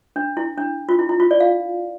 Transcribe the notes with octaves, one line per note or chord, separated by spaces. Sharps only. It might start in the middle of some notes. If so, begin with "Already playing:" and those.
D4
E4
D4
F4
E4
E4
F4
D5
F5